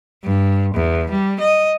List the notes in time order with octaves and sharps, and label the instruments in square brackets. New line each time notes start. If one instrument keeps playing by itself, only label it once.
[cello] G2
E2
G3
D#5